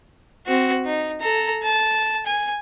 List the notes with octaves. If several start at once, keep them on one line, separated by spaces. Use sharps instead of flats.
C4 F#4
D#4
A4 A#5
A5
G#5